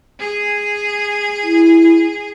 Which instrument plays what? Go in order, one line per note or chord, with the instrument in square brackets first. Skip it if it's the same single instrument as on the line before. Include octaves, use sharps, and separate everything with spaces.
[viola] G#4
[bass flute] E4